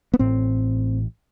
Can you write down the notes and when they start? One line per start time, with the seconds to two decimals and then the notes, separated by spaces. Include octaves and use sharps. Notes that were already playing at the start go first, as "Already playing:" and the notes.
0.14 B3
0.19 A1 A2 C4